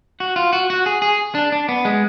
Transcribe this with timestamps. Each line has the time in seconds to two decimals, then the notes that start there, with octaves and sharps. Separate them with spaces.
0.20 F#4
0.36 F4
0.53 F#4
0.70 F#4
0.86 G#4
1.02 G#4
1.35 D4
1.52 D4
1.69 B3
1.85 G#3